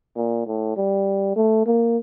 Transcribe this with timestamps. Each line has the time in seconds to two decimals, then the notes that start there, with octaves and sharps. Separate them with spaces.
0.16 A#2
0.46 A2
0.77 G3
1.36 A3
1.66 A#3